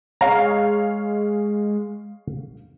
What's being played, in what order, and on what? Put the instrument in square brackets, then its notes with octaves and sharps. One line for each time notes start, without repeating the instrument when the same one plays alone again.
[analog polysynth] G#3 [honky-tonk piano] C#5 F5 [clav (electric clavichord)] A#5